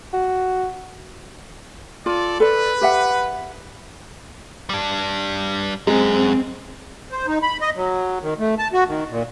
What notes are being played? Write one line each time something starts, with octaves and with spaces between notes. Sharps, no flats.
F#4
F4 A4 D5
A4 B4 D5
G4 E5 F#5
G3 D4
F#2 G#3 C4
C5
D#4
B5
D#5
F#3
D#3
A3
A5
F#4
D#3
A#2